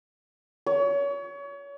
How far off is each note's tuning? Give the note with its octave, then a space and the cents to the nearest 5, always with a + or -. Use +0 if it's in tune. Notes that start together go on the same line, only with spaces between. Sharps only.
C#5 +30